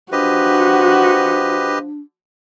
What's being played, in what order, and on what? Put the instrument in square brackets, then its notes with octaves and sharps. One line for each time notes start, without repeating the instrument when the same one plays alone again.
[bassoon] F3 [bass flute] D4 [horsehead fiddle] F#4 [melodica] G4 B4 D#5